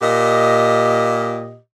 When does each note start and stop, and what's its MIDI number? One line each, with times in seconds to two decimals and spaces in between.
0.02 1.58 46
0.02 1.58 67
0.02 1.58 75